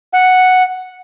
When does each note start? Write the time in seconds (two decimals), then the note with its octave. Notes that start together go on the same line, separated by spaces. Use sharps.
0.13 F#5